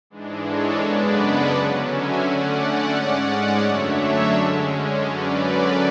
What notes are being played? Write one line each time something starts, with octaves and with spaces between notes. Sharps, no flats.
G#2 E3 G#3 D4
A4 C#5
F#2 C#3 G#3 B3 D4 B4 D5
D5 F#5
D3 F#3 C#4
E5 G#5
D3 A3 C#4 D5 F#5
G#2 G#3 C#4 D5 F#5
F#2 D3 F#3 A3 D4 C#5 E5
D3 G#3 C#4
F#2 D3 F#3 C#4 B4 D5